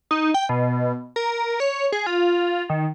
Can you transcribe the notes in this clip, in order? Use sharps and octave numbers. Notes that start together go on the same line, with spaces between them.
D#4
G5
B2
A#4
C#5
G#4
F4
D#3